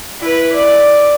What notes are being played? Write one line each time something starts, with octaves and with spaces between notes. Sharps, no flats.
E4 B4
D5